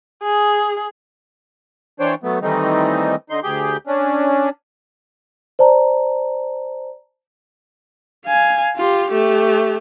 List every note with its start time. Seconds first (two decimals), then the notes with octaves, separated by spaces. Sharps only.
0.23 G#4
2.00 E3 D4 C5 C#5 G5
2.23 F#3 A3 B3
2.42 D#3 E3 G3 A3 C4 D#4
3.30 D3 D#4 C6
3.43 D2 G4 G#4 G6
3.87 C#4 D4
5.59 C5 D5 A5 A#5
8.26 F5 G#5
8.77 F4 G4
9.11 A3 G4